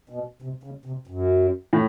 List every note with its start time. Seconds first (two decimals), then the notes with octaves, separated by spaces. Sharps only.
0.09 B2
0.42 C3
0.64 C#3
0.86 C3
1.07 F#2
1.73 A2